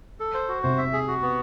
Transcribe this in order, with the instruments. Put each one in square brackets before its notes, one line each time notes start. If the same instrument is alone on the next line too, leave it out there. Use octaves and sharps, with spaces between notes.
[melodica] A4
C5
F#4
[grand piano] C3 [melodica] C5
[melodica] E5
G#4
F#4
B3